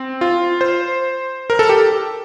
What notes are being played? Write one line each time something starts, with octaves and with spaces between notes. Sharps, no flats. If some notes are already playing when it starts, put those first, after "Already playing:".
Already playing: C4
F4
C5
A#4
A4
G4